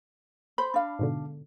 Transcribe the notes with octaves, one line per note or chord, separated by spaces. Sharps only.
C5 B5
D4 F5
G#2 B2 D3